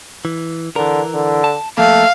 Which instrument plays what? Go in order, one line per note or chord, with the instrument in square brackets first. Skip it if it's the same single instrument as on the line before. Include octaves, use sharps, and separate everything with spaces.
[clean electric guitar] E3
[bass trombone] D3 [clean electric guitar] E3 A#4
[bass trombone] D3
[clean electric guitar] A5
[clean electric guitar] F3 A#3 [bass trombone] A3 [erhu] F5